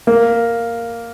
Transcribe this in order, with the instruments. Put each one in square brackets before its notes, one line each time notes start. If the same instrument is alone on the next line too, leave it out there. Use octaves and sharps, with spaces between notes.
[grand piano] A#3